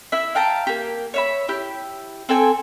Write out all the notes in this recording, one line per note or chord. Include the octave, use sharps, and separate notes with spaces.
E4 E5
F5 G5 A5 A#5
A#3 G4
C#5 E5 B5
E4 G4
C4 A4 G5 G#5